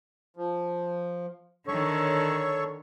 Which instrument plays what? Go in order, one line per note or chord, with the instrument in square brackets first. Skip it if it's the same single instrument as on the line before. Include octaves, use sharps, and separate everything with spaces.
[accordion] F3
[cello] D3 D#3 [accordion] A4 C#5 C#6